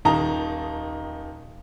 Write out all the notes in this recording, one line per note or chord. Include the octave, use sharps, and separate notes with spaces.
D#1 D#3 D#4 A5 A#5